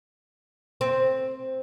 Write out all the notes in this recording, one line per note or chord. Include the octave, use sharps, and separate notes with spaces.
C4